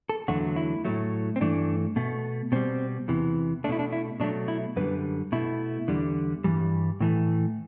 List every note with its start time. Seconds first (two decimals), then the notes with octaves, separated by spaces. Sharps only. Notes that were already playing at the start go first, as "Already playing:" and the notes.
0.09 A4
0.28 E2 D3 F#3 A3 F#4
0.56 E4
0.85 A2 F#3 A3
1.36 C4
1.41 G2 E3 A3 D4
1.96 B2 A3
2.52 B2 G3 C4
3.08 E2 C3 E3
3.64 A3 D4
3.69 B2 E4
3.79 D4
3.92 E4
4.20 B2 F#3 A3 D4
4.48 E4
4.76 F#2 D3 G3 B4
5.32 B2 A3 E4
5.88 E2 D3 G3
6.44 G2 E3 G3
7.00 A2 E3 A3